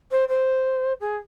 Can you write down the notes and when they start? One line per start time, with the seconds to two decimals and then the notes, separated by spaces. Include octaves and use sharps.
0.11 C5
0.28 C5
1.00 G#4